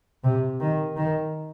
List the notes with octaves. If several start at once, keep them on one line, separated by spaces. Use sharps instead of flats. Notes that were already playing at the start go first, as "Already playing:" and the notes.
C3
D#3
D#3